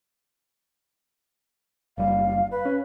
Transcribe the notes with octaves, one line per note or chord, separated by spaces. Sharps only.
F#1 G3 F5
B4
C#4